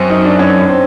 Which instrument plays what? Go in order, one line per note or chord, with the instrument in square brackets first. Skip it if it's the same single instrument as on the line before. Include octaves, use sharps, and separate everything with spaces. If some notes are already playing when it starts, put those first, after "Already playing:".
Already playing: [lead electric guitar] F#2 [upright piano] C4
[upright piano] D#4
D4
C#4
C4